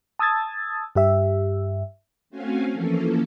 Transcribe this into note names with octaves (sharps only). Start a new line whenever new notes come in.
A5 D#6 E6 G#6 A6
G2 G4 E5
A3 C4 C#4 F#4 F5 G#5
E3 F3 A#3 C#4 A4